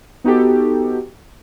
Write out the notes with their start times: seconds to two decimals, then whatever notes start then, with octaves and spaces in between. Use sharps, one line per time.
0.24 B3 D#4 F#4 G4 A4